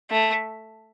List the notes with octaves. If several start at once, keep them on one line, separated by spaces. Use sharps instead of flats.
A3